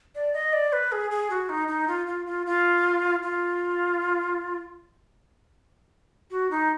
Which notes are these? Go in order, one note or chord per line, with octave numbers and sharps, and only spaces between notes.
D5
D#5
D5
B4
G#4
G#4
F#4
D#4
D#4
F4
F4
F4
F4
F4
F#4
D#4